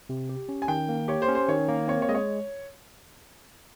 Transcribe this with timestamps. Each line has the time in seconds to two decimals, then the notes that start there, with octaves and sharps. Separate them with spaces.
0.09 C3
0.29 G4
0.49 C#4
0.62 G#5
0.68 D#3 G5
0.89 A#3
1.08 G4 C#5
1.22 C5
1.28 C#4
1.35 C5
1.48 D#3 C#5
1.69 A#3
1.88 C4 C#5
2.02 C#5
2.09 G#3 D#5
2.15 C#5